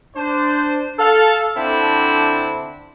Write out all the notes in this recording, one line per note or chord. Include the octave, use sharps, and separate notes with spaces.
D4 C5
A4 F5
D3 C4 D4 E4